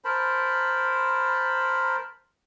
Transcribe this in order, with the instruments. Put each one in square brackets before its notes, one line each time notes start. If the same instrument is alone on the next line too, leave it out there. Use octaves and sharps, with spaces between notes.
[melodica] A#4 C5 A5 B5